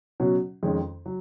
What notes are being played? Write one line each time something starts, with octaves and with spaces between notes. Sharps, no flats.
B2 F#3 C#4 F#4
F2 D#3 G#3 C#4
F#3